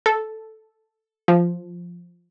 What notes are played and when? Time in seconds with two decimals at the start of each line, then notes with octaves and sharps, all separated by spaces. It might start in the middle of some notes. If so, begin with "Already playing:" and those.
0.06 A4
1.28 F3